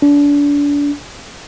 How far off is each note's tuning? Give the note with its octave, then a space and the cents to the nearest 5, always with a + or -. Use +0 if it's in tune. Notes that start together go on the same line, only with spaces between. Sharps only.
D4 -30